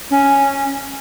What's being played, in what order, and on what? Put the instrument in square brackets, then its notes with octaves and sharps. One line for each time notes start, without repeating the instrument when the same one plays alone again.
[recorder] C#4